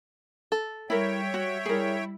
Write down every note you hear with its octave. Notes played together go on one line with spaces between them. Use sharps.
A4
G3 E4 A#4 C#5 E5 G5
F#4
G3 E4 G#4 A#4